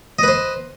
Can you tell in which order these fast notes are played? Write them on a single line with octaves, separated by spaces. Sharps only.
D#5 B4 C5